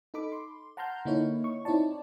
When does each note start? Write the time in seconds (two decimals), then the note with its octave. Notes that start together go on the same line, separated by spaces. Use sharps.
0.14 D#4 A4 B5 D6
0.32 C6
0.77 F#5 A5 A#5 C6 F6 G6
1.05 D3 A#3 D#4 E4 C#5
1.44 C#6
1.65 C4 D#4 E4 C#5 D5 A5